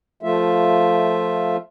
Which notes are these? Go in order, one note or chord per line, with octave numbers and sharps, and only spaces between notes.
F3 A3 F4 E5